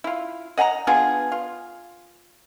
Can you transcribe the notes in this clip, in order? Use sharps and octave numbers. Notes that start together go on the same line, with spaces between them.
E4 F4
D#5 F#5 G#5 A#5
B3 D4 F4 G#4
F4